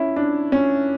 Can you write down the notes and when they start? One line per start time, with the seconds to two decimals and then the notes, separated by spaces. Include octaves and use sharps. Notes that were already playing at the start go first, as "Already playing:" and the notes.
Already playing: C#4 E4
0.16 D4
0.52 C#4